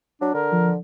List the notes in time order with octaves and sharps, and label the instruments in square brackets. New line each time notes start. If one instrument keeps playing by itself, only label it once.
[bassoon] F#3 [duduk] D4
[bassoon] D3 [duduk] A#4
[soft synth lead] F3